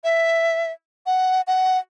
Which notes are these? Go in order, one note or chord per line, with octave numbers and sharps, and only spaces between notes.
E5
F#5
F#5